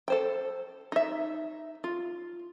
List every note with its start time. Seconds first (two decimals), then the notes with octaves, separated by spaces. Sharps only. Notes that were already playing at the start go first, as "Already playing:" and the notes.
0.08 A4 C5 G5
0.92 D#4 E5
1.84 F4